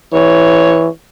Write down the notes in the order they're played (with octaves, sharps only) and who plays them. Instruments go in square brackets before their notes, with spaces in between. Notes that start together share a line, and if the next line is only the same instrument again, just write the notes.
[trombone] E3 [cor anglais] C#5